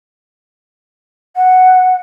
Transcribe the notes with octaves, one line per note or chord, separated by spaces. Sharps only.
F#5